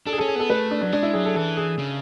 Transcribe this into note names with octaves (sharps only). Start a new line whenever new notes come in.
D4 A4
G#4
C#4 A4
G#4
B3 A4
A3 B4
D4
F#3 D4
G#3 D4
E4
F#3 G#4
A4
E3 A4
G#4
C#3